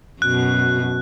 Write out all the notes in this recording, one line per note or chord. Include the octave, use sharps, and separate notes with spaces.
F#2 B2 F#6